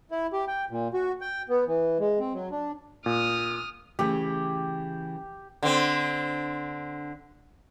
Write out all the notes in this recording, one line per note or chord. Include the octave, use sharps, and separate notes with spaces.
E4
G4
G5
A#2
F#4
G5
B3
E3
G#3
C4
F#3
D4
A#2 D#6 F6
C#3 E3 A3 G4
D3 C4